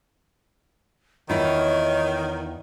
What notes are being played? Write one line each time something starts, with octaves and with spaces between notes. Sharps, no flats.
E2 D#3 E4 F4 C#5